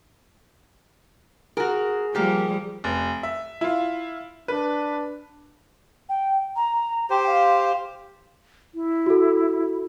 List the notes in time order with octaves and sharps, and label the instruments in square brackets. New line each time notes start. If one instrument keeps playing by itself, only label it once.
[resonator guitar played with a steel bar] F#4 A#4 [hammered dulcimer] G#4
[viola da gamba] F3 G3 [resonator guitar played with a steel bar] A#3 G4
[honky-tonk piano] F1
E5
E4 F4
[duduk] D4 [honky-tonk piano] B4
[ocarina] G5
A#5
[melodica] G4 C5 [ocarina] G5
[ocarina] F5
[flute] E4
[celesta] F#4 A4